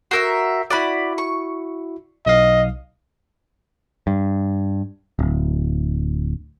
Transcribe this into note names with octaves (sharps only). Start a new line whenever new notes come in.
F#4 A#4 E5 E6 G6 C7
E4 F#4 D5 F#5 B5
C#6
B1 D#5 F5
G2
D1